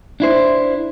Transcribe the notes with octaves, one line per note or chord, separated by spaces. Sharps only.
D4 E4 C5